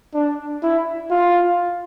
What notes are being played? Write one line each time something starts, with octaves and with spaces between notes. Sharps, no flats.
D4
E4
F4